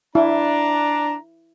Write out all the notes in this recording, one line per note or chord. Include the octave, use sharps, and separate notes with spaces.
D4 E4 A#5